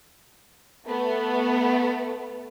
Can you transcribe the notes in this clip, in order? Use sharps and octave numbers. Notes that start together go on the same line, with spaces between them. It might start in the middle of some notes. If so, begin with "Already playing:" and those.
A3 B3